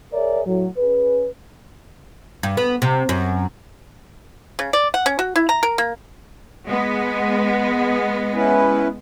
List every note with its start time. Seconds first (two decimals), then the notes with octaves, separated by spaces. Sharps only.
0.13 G#4 A#4 C#5 D5 E5
0.45 A2 F#3
0.77 C#4 G#4 B4
2.43 G2
2.57 B3
2.82 C3
3.09 F#2
4.59 C#3
4.73 D5
4.94 F#5
5.06 C#4
5.19 F#4
5.36 E4
5.49 A#5
5.63 A#4
5.78 A#3
6.68 G#3 B3
8.34 C#4 E4 B4